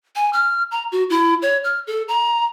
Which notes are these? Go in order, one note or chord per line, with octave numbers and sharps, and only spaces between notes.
G#5
F6
A#5
F#4
E4
C#5
F6
A4
A#5